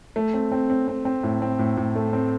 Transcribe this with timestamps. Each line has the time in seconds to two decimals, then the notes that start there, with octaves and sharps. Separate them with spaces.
0.16 A3
0.34 C4
0.52 C4
0.70 C4
0.88 C4
1.05 C4
1.23 A2
1.42 C4
1.59 A2
1.77 A2
1.96 A3
2.13 C4